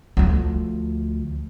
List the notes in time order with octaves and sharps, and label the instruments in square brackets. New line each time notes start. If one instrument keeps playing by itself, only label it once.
[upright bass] D2 F3